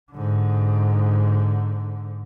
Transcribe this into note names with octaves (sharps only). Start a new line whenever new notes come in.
G#2 D3